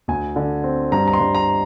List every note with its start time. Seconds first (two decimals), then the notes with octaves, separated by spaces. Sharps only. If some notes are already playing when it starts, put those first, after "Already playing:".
0.08 D2 G#5
0.36 D3
0.64 C4
0.92 G2 A#5
1.08 A#5
1.13 C6
1.20 G2
1.35 A#5